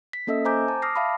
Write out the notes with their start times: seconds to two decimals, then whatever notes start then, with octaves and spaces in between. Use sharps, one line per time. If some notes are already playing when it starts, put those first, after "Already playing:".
0.13 B6
0.27 A#3 C#4 A4 D#5 E5 E6
0.45 C5 G#5 A#5 D6 G6
0.68 A5
0.82 D6 D#6 F6 A#6 C7
0.96 E5 F5 A5 B5